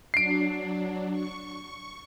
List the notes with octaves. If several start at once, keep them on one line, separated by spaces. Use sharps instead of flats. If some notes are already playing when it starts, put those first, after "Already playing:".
F#3 D4 C7 D7
C#6